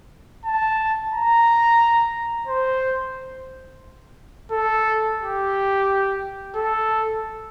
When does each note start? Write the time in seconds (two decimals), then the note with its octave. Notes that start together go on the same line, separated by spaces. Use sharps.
0.45 A5
1.13 A#5
2.48 C5
4.51 A4
5.20 G4
6.55 A4